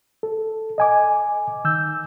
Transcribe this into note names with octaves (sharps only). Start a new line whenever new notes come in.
A4
D#5 G#5 D6
D#3 E6 G6